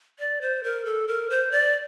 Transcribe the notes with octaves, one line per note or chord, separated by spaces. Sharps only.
D5
C5
A#4
A4
A#4
C5
D5